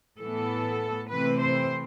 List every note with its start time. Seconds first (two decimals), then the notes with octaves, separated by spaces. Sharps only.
0.19 A2 E3 B3 A4
1.10 C3 E3 A3 C4 B4
1.41 C5